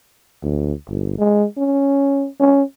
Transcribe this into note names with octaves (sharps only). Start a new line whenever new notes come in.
D2
G1
G#3
C#4
C#4